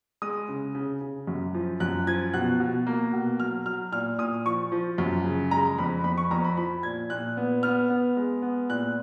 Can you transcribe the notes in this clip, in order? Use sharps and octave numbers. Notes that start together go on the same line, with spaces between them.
G#3 D#6
C#3
C#3
C#3
F#2
F3
F#2 F#6
F3 G#6
B2 F#6
B2
A#3
B2
F#3 F6
F#3 F6
A#2 F6
A#2 D#6
F3 C#6
F3
F#2
C#3
G#3 A#5
F2 B5
F2 B5
C#6
F2 A#5
B5
F3 B5
A#2 G#6
A#2 F#6
B3
B3 F6
B3
G#3
B3
A#2 F#6